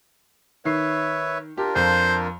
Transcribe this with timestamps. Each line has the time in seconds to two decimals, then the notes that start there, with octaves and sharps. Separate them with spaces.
0.65 D#3 B4 C#5 E5 C7
1.57 D4 F4 G4 A#4
1.76 F2 C5